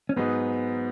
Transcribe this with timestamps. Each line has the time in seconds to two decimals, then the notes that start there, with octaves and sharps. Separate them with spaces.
0.09 C#4
0.16 G#2 F#3 B3 D#4 G#4 B4